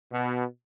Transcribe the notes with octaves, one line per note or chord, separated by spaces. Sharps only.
B2